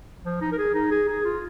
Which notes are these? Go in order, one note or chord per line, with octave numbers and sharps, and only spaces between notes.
F3
D#4
A#4
G#4
D#4
G#4
G#4
F4